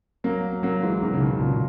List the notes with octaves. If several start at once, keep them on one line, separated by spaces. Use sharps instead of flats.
F#3 A#3
F#3 A#3
E3 G#3
D#3 F#3
C#3
B2 D#3
A#2 C#3